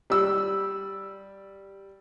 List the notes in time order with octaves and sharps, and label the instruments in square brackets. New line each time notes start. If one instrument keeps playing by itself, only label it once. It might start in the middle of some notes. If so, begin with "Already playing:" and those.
[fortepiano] G3 E6